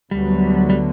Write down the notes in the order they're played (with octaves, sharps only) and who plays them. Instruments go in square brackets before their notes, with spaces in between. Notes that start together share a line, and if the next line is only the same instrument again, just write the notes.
[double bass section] D2 D3 F#3 B3 [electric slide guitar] G3
[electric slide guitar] G3